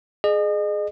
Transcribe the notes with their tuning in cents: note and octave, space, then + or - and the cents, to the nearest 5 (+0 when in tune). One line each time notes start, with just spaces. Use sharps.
G#4 +15 D#5 -35